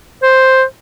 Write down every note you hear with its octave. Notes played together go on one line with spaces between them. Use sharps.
C5